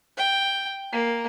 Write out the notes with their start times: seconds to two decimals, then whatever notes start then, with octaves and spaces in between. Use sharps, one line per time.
0.17 G5
0.92 A#3